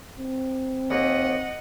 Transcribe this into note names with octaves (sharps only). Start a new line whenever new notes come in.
C4
D#2 D#5 F#5